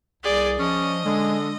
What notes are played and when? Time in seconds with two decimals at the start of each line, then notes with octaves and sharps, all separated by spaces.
0.23 C2 G#4 D5 G6
0.59 F3 C#4 D#5
1.05 D3 G#3